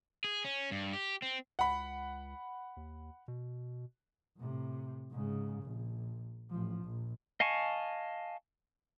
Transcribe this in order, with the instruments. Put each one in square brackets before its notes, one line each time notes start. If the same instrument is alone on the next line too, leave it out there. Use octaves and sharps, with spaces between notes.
[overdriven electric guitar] G#4
C#4
G2
G4
C4
[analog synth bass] C#2 [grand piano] F#5 B5
[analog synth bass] D#2
B2
[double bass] A2 C3
G#2 C#3
A#1
A1 F3
A#1
[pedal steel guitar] D#5 F5 G#5 A5 C#6